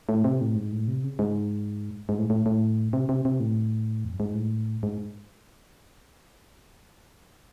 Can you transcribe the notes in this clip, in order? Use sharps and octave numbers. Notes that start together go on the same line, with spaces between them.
A2
C3
A2
G#2
A2
C3
C#3
G#2
G#2
A2
A2
A2
C3
C3
C3
A2
E2
F#2
G#2
A2
G#2